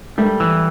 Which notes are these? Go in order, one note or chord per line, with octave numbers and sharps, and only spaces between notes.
G3 A3
E3